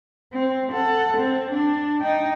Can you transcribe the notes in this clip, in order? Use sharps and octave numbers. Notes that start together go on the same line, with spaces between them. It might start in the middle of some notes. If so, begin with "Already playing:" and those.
C4
A4 F#5
C4
D4
D#4 G5